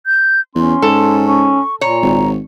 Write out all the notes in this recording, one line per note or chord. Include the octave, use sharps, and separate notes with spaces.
G6
E2 C#4 C6
G#2 A4
C#4 C#6
A#2 C#5 A#5
G#1